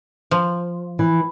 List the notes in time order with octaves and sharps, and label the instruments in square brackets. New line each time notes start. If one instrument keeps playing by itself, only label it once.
[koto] F3
[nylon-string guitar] E3